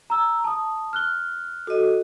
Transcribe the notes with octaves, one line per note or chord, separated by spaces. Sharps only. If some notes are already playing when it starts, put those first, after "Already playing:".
A#5 E6
A5 D#6
F6 F#6 G7
F#4 A4 D#5